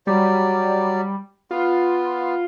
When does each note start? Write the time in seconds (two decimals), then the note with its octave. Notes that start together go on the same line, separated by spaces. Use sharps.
0.07 F#3 G3 D5
1.51 B3 F4